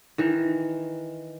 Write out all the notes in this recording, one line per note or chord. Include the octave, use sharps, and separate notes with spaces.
D#3 E3